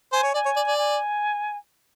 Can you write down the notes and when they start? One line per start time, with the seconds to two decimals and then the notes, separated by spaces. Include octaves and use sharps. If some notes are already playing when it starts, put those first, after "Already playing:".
0.12 C5 G#5
0.23 C#5
0.34 D5 G#5
0.45 C#5
0.56 D5
0.67 D5
0.78 G#5